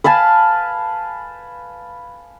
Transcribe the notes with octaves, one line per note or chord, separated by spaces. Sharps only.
B4 F5 G#5 A5